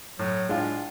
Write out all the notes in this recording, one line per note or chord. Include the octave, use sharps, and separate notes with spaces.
A2 F#3
A2 G#3 D4 F4